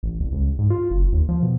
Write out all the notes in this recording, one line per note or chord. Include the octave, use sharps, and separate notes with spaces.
A1
C2
C#2
G#2
F4
F#1
D#2
F3
B2